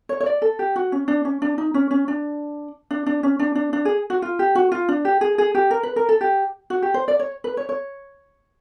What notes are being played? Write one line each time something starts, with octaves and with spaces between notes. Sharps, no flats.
C#5
C#5
D5
A4
G4
F#4
C#4
D4
C#4
D4
D#4
C#4
C#4
D4
D4
D4
C#4
D4
D4
D4
G#4
F#4
F4
G4
F#4
F4
D4
G4
G#4
G#4
G4
A#4
B4
A#4
A4
G4
F#4
G4
C5
D5
C#5
B4
C#5
C#5